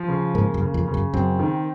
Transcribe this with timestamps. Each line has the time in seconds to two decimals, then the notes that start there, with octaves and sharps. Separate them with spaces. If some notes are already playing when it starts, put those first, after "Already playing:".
Already playing: F3
0.08 C#3
0.34 G#2 A#3
0.54 F#2
0.61 C#3
0.74 F2
0.88 C#3
0.94 F#2
1.13 F#2 C4
1.39 D#3